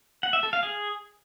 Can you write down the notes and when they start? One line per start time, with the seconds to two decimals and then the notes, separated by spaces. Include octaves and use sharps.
0.23 F#5
0.33 E5
0.43 A4
0.53 F5
0.63 G#4